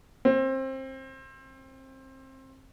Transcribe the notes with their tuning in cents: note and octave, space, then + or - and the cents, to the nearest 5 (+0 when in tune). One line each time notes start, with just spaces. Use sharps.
C4 +25